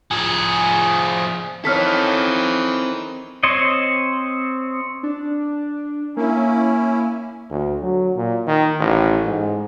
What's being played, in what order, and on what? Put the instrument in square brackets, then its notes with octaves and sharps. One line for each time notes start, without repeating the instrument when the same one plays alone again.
[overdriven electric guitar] F3 G#4
[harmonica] D#3 E3 [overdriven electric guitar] C4 A4 [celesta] C#5 F6 B6
[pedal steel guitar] C4 C5 C#5 D#5
[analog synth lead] D4
[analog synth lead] A#3 [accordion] C#4 E4
[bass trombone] D2
F#3
A#2
D#3
A1
G#2